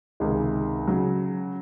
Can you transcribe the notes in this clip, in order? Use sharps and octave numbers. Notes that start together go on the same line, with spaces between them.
C#2 C3 D#3 G#3
C#3 F#3